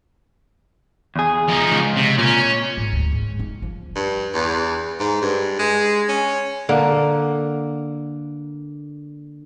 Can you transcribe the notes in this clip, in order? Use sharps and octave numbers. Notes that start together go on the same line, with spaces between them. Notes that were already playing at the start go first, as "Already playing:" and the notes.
E2 G#4
F3 D#4
C#2
C3
A#2 C#4
G#2
D2
G#2
D#4
F3
G2
E2
G#2
G2
G#3
C#4
D3 A#3